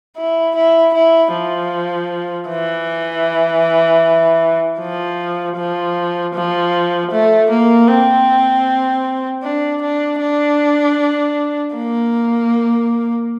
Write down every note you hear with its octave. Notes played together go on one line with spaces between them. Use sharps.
E4
E4
E4
F3
E3
F3
F3
F3
A3
A#3
C4
D4
D4
D4
A#3